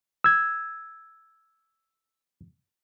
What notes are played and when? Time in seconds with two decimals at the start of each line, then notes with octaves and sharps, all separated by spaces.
0.24 E6 G#6